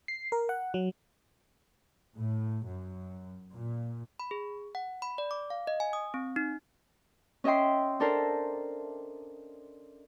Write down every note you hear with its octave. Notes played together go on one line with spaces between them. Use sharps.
C7
A#4
F#5
F#3
A2
F#2
A#2
B5
G#4
F#5
B5
D5
D6
F5
D#5
G#5
D#6
C4
D#4
C#4 D#5 E5 G5 C6
D4 A4 A#4 C5